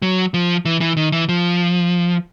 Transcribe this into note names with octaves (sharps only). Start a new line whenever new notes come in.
F#3
F3
E3
E3
D#3
E3
F3